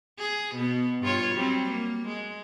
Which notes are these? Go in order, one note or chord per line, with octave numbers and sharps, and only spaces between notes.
G#4
B2 B3
G2 F4 C#5
F#3 G3 C4
A#3
G#3